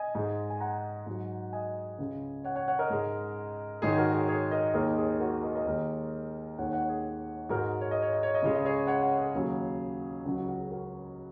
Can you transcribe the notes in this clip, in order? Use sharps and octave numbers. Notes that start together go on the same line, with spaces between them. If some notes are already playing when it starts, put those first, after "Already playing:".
Already playing: D#5 G#5
G#2 G#3
G#5
F#5 A#5
G#2 F#3
D#5 G#5
C#2 C#3 G#3
C#5 F#5
C#5 F#5
C#5 F#5
A#4 D#5
G#2 G#3
G#2 D#3 G#3 G#4 C#5
F#4 A#4
G#4 C#5
G#4 C#5
A#4 D#5
D#2 D#3 G#3 A#4 D#5
G#4 C#5
F#4 A#4
A#4 D#5
A#4 D#5
D#2 D#3 G#3 A#4 D#5
D#2 D#3 G#3 C#5 F#5
C#5 F#5
G#4
G#2 G#3 F#4 A#4
C#5
D#5
C#5
D#5
C#5
D#5
C#2 C#3 G#3 C#5
D#5
G#4 C#5
C#5 F#5
C#5 F#5
G#4
D#2 C#3 F#3
C#2 C#3 F#3
F#4
F#4
G#4
F#4 A#4